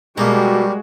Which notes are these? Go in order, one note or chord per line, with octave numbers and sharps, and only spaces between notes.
B2 G3 G#3 A#3 F#4 G4 A4 A#5